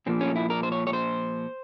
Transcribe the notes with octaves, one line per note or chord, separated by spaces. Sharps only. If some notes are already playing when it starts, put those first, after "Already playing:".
A#2 F3 A#3 C4
C#4
E4
A#4
C5
C#5
C#5
C5